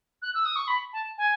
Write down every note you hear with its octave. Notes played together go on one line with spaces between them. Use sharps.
F#6
E6
D#6
C#6
B5
A5
G#5